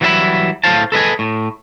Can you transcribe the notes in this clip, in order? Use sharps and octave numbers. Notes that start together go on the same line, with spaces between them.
E3 F#3 G3 F4 E5 B5
A2 C5 F5 A5
A4 B4 D#5 G#5
A2